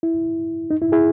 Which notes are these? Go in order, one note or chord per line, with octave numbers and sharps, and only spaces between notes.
E4
D#4
E4
E4 G#4